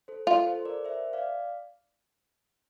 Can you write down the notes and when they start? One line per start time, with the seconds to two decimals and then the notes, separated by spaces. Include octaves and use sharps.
0.08 A4 C5
0.27 F4 A4
0.47 A4 C5
0.65 A#4 D5
0.84 C5 E5
1.13 D5 F5